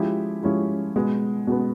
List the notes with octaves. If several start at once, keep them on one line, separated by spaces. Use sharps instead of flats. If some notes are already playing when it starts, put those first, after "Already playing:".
Already playing: F3 G#3 C#4 E4 G4
F3 G#3 C#4 E4 G4
B2 G#3 B3
B2 G#3 B3